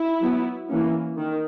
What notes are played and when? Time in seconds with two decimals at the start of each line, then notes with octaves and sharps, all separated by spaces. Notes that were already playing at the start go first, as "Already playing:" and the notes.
Already playing: E4
0.20 F#3 B3
0.69 E3 A#3 C#4
1.18 D#3